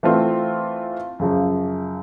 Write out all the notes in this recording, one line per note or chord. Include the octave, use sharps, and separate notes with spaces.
E3 A3 C4 F4
F#2 C#3 F3